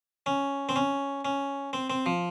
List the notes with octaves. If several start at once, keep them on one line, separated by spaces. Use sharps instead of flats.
C#4
C4
C#4
C#4
C4
C4
F3